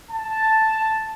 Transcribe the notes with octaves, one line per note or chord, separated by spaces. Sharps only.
A5